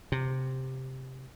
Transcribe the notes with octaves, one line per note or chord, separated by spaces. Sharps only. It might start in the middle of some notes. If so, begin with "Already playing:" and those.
C3